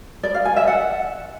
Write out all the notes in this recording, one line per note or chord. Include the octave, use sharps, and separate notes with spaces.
D5
F5
G#5
E5
F#5